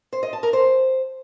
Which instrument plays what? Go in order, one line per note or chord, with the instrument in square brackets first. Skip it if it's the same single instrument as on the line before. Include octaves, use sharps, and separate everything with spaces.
[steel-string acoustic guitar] C5
D#5
A5
A#4
C5